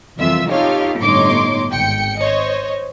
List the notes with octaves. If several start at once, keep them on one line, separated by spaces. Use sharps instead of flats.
C2 F2 E3 F4 E5 E6
D#4 F4 G4 A4 C#5 F5
G1 A2 D#4 C#5 C6 D6
G#1 G5 C#7
C5 C#5 D#5